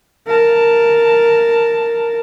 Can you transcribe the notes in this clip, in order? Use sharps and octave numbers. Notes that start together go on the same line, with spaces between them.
A#4 A5